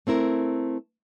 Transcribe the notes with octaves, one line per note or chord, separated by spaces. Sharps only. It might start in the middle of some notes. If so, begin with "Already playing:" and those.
A3 C4 E4 A#4